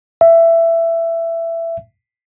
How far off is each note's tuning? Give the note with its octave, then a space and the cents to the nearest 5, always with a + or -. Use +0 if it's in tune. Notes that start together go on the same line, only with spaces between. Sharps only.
E5 +15